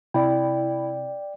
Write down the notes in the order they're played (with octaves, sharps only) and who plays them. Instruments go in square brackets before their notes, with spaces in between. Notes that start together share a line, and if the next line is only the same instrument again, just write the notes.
[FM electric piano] C3 [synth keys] E4 [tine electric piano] D5 G5